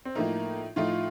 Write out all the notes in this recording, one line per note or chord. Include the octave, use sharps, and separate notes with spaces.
C4
A2 F3 A3 A#3 D#4
A2 F3 A3 D#4 F4